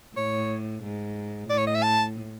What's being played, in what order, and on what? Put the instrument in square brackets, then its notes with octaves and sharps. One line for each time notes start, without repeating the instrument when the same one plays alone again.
[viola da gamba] A2 [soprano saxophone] C#5
[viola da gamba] G#2
[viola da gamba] A2 [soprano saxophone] D5
[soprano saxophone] C#5
D#5
E5
A5